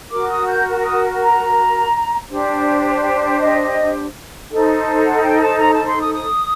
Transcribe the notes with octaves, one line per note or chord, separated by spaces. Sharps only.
F#4 A#4 D6
D#6
G6
D#6
A#5
D4 G4 C5
D#5
D#4 A4 C5
F#5
G5
A5
A#5
A5
C6
D#6
D#6